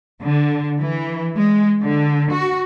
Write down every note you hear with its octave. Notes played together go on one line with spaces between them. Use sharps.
D3
E3
G#3
D3
F#4